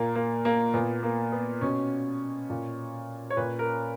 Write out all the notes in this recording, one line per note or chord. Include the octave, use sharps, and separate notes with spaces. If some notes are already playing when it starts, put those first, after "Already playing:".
Already playing: A#2 A#3
A#3
A#3
A#2 B3
A#3
B3
B2 C#4
A#2
C#5
A#2 B4
A#4